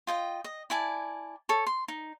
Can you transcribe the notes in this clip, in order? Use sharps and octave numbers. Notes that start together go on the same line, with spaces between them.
F4 D#5 G5
D#5
E4 D5 G#5 A5
A4 C#5
C6
D#4